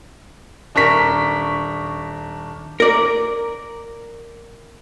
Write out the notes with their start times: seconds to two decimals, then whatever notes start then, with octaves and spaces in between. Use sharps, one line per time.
0.75 D#1 D4 A#4 C#6 B6
2.80 A#4 D5